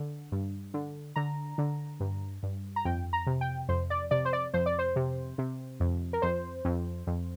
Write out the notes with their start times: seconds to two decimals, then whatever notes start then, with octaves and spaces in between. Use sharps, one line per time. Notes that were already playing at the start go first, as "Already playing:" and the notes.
Already playing: D3
0.32 G2
0.74 D3
1.16 D3 A#5
1.58 D3
2.00 G2
2.43 G2
2.76 A#5
2.85 F2 G5
3.13 A#5
3.27 C3
3.41 G5
3.69 F2 C5
3.90 D5
4.11 C3 D5
4.25 C5
4.33 D5
4.54 F2 C5
4.66 D5
4.79 C5
4.96 C3
5.38 C3
5.80 F2
6.13 A#4
6.22 F2 C5
6.65 F2
7.07 F2